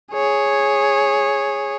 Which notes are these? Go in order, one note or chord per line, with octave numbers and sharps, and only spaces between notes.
G#4 C#5